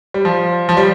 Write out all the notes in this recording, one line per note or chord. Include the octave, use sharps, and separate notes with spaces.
G3
F3
F3
G3